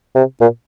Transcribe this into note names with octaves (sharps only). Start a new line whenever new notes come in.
C3
A#2